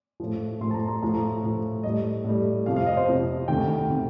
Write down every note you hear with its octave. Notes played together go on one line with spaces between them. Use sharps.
A2 F3
A2 F3 C6
A5
A#5
C6
A2 F3 A#5
A2 F3
A2 G3 D#5
A2 G3
F2 C3 F3 F5
F5
D#5
C5
F2 C3 F3
D2 C3 D#3 G5
C3 D#3